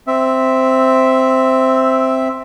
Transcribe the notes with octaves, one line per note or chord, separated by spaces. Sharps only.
C4 E5